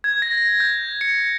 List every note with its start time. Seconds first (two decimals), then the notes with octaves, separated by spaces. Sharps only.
0.04 G#6
0.22 A#6
0.60 G6
1.01 C#7